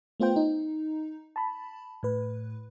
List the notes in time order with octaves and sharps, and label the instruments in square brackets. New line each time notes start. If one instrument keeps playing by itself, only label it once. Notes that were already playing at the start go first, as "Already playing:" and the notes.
[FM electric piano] A3 B3 F4 C5 G5
D#4
A5 B5
A2 B4